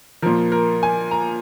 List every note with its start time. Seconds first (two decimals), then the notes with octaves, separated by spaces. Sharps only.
0.22 A#2 F3 A#4
0.52 A#4
0.83 G#5
1.11 A#5